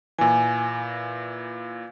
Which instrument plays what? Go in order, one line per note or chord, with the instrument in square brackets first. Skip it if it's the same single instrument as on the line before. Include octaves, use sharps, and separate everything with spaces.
[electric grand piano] A#2 E3 [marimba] G#5